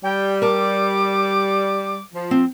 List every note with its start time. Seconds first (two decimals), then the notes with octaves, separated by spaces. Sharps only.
0.03 G3 G5
0.42 A#4 A5 D6
2.14 F3
2.31 C4